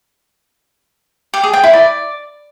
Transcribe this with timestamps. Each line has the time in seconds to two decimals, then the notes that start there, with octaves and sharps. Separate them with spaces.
1.34 G4
1.44 G#4
1.54 G5
1.63 E4
1.73 D5